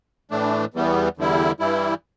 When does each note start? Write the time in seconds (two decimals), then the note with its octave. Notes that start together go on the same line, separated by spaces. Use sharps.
0.31 A2 E3 A3 D4
0.74 E2 E3 G3 B3
1.17 E2 D3 G3 E4
1.60 G2 E3 G3 E4